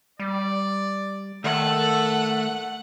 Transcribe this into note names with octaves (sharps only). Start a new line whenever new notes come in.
G3 D5
D#3 A3 A4 F#5